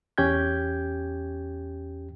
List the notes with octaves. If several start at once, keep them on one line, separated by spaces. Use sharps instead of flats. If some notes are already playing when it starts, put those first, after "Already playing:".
E2 C#4 G4 G5 G6 G#6